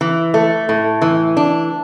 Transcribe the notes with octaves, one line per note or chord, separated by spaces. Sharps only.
E3
A3
A2
E3
D4